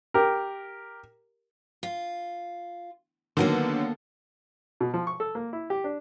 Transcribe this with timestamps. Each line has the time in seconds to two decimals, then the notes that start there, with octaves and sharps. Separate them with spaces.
0.14 G4 A#4
1.83 F4
3.37 D3 D#3 F#3 A#3 B3 A4
4.80 B2
4.94 F3
5.07 C#6
5.20 A4
5.35 A#3
5.53 E4
5.70 G4
5.84 D4